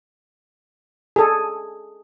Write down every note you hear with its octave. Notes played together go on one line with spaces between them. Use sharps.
G#4 A4